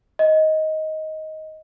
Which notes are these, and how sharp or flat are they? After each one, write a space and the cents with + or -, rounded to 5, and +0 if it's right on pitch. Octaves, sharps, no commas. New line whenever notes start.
D#5 +15